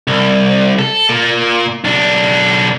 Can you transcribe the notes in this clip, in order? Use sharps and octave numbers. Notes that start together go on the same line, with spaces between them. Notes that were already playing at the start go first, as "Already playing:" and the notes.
C2
A4
A#2
B1 D4